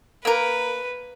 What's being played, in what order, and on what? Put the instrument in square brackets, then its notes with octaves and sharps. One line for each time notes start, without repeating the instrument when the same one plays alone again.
[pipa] A#3 A#4 [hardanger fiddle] B4